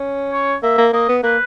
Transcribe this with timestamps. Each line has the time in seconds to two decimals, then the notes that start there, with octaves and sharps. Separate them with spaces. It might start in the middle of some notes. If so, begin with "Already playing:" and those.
Already playing: C#4
0.33 C#5
0.63 A#3 E5
0.78 A#3
0.93 A#3 D#5
1.09 B3
1.23 A#3 B4